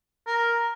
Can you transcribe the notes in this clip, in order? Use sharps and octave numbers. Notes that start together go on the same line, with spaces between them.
A#4